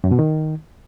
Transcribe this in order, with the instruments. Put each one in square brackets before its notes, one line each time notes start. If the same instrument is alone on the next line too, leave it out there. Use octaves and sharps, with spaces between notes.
[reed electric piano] F#2
B2
D#3